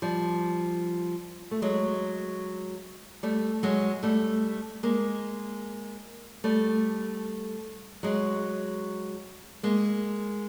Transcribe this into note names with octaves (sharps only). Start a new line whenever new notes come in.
F3 G3
A3
F#3 G#3
G3 A3
F#3 G#3
G3 A3
G#3 A#3
G3 A3
F#3 G#3
G#3 A#3